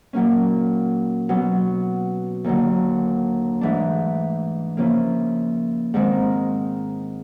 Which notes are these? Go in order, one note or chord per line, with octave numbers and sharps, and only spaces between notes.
A#2 F#3 A#3 C#4
B2 F#3 B3
D#2 D3 F#3 A#3 D#4
G#2 E3 A3 D4
C#3 F3 A#3 C#4 E4
G#2 D#3 G#3 C4